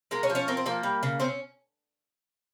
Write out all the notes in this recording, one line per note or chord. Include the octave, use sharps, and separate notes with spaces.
G#3 A#3 A#4
C#4 C#5
F3
C#4 C#5
C4 A#4
C5
F3 A#3 A#4
G3
C#3
C4 C#4 C5